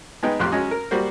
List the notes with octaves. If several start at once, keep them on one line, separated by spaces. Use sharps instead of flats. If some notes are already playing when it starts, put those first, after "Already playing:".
G#3 B3 D#4 G5
A1 F2 G4 C6 F#6
F#3 G#3 C#4 D#5
A#4
G3 A#3 F#4 C5